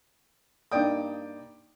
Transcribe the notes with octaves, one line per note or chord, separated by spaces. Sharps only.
G2 A#3 D#4 D5 G5 D#6